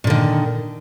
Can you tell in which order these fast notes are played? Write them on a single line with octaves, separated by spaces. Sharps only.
A#2 D3 D#3